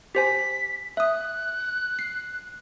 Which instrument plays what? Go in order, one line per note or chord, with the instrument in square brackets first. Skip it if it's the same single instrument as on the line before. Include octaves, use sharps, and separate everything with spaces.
[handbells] G4 C5 G#5 [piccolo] B6
[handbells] E5 D#6 [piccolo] F#6
[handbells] C7